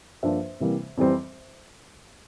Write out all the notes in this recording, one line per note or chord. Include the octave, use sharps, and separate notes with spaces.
G2 F3 A#3 D4 C5 E5
C3 E3 G3 A#3
F2 E3 G3 C4